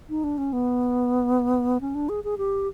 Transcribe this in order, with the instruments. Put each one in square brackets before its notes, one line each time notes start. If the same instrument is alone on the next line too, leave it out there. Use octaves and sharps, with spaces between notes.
[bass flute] D#4
D4
C#4
B3
C#4
D4
G#4
G#4
G4